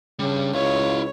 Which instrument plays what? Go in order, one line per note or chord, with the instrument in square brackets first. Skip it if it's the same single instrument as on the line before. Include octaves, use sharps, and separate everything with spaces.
[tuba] C#3 [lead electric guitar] G3 D4
[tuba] C#2 [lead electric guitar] E4 F5 [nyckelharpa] C#5